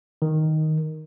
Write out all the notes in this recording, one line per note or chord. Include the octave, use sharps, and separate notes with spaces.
D#3